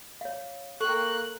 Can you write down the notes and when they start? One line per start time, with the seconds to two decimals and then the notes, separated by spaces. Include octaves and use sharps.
0.21 C#5 F5
0.81 A#3 A4 G5 C#6 F#6